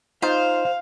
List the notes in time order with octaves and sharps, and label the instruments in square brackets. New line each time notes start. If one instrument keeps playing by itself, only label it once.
[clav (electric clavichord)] D#4 F4 [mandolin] C5 [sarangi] F5